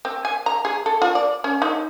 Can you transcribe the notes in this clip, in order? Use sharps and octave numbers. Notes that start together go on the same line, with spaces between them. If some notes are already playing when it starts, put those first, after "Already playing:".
C4
G#5
A#5
G#4
A4
F4
D5
C#4
D#4